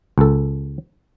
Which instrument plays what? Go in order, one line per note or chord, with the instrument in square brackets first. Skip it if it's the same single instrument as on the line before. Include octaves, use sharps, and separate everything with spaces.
[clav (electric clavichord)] C#2 A4